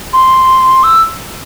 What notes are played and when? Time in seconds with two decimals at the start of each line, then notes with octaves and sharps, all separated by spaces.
0.13 C6
0.83 E6